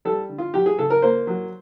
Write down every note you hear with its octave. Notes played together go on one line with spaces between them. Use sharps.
G3 A4
D3
F4
F#3 G4
G#4
C#3 A4
A#4
A#3 C5
F#3